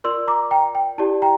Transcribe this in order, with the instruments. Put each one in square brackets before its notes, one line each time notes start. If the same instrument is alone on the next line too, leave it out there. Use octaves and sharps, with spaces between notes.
[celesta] F4 A#4 D5 C6 E6
A#5 D6
G5 A#5
G5
E4 G4 D5 A5
G5 A#5